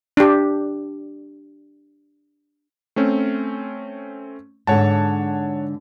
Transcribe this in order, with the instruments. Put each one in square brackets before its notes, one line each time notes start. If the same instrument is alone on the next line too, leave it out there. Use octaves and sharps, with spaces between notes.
[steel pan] D4 G4
[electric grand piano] A3 C4 C#4
[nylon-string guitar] G#2 D3 [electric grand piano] C#5 F#5 A5